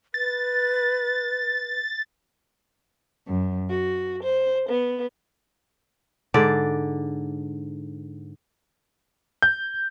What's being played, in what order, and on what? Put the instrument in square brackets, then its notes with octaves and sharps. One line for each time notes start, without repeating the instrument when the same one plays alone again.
[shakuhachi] B4 [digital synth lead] A6
[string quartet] F#2
F#4
C5
B3
[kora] G#2 D3 D5
[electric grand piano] G6